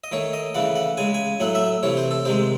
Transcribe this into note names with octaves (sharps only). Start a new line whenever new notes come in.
D#5
D#3 A3 C#5
D#5
C#3 E3 A3 F#5
F#5
C#3 G#3 G#5
G#5
A2 F#3 A3 F#5
E5
C3 E3 A3 C#5
C5
A4
C3 D#3 G#3 C5